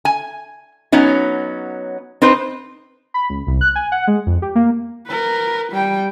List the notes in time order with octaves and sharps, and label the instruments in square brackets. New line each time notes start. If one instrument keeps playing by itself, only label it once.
[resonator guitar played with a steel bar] G#5
F#3 B3 C#4 D#4
C4 D#4 B4 C5
[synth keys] B5
C#2
C2
F#6
G#5
F#5
G#3
F2
G4
A#3
[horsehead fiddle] A#4 B4
G3 G5